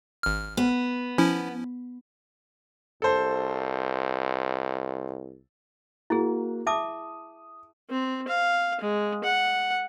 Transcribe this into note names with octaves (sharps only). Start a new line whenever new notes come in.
G#1 F6
B3
F3 C#4 E4
C2 A4 C5
A#3 E4 F#4 G#4
E5 A5 D6 D#6
C4
F5
G#3
F#5